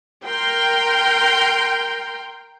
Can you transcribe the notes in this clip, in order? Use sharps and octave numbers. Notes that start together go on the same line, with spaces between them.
A#4 G5 C6